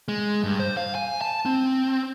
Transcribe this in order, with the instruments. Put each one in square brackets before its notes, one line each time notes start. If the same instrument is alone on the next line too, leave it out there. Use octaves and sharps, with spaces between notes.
[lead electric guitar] G#3
G2
C5
F5
G#5
A5
C4